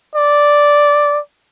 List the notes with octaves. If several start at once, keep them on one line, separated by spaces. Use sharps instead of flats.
D5